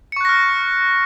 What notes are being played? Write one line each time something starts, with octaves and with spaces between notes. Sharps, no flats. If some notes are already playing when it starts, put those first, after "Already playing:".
C#6 F6 F#6 A#6 C#7